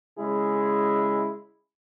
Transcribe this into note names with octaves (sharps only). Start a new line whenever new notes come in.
C#3 G#3 E4 G#4